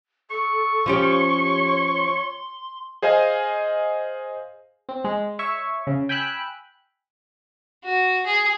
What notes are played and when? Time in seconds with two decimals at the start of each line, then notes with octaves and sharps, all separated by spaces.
0.31 A4 C#6
0.86 F3 C#4 G4 C#5 C6
3.02 G#4 C5 D#5 F5 G#5
4.89 C4
5.04 G#3
5.39 C#5 E5 C#6
5.87 C#3
6.09 G5 G#5 B5 E6 F#6
7.84 F#4
8.26 G#4